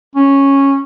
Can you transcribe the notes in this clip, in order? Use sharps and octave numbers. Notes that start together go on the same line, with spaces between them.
C#4